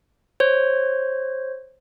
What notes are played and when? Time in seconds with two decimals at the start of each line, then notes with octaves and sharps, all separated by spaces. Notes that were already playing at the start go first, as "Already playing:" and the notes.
0.40 C5 C#5